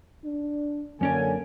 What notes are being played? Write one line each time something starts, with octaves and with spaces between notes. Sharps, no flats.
D4
F#2 D3 A#3 C#4 D4 G#5